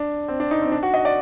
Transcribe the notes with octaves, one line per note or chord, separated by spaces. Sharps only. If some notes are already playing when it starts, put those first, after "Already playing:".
Already playing: D4
C4
D4
D#4
C4
D4
F#4
D#5
D5